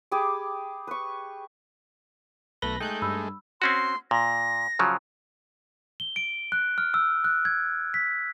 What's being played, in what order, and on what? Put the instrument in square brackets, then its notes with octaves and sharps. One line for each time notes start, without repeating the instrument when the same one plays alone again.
[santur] G4 G#4 B5 D6
B4 C#6
[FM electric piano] B1 A#6 [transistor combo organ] A3 [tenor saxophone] B4 [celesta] G7
[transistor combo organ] G#3 A3 [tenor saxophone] D#4 [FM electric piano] G5 F#6 G6
[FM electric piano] G2 [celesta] B5 E6
[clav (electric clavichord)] C4 C#4 F#4 [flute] C6
[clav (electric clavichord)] A#2 [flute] A#6
[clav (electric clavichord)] C#3 F3 F#3
[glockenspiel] G7
D7
F#6
F6
E6
F#6
G#6
B6